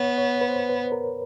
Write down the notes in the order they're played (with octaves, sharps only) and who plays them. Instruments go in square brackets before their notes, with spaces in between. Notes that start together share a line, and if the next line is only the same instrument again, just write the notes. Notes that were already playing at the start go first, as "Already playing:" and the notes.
Already playing: [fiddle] B3 [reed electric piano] C#5
[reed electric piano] C#5
B4
C5
B4
A#4